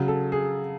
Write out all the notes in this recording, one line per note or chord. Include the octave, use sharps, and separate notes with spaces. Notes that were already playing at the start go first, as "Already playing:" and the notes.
Already playing: C#3 F#3
A4
G#4